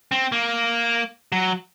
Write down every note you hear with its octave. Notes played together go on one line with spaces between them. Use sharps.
C4
A#3
F#3